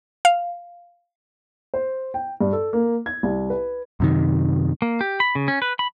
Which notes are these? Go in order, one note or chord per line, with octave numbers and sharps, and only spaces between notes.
F5
C5
G5
G2
A4
A#3
G#6
C2
B4
F#2 C3 D#3
A#3
G4
B5
C#3
C#4
B4
B5